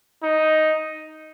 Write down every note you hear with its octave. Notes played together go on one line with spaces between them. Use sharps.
D#4